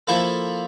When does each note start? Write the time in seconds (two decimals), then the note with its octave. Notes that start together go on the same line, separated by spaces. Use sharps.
0.07 F3 A#3 E4 A4